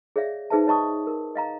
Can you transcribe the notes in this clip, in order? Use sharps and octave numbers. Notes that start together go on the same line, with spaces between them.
G#4 C#5 D5 E5 F5
D#4 G#4 B4 C5 E5 A5
C#5 D#5 A5 C#6 D#6
A#4
D#5 F5 A#5